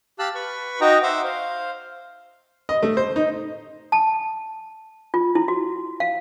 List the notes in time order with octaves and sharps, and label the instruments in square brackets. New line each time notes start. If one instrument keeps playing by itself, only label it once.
[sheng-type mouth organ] G4 F5 A5 E6 F#6
B4 B5 C#6
D#4 F#4 D#5 G5 A#5
C5 E5 F#5 D6
C5 F5
[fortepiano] D#5
A3
C5
D#4
[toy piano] A5
F4
E4
F#4
F5